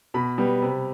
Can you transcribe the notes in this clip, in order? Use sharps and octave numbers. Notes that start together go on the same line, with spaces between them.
B2 B5
G3 B3
C3